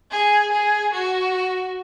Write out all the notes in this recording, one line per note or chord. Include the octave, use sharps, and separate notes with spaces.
G#4
G#4
F#4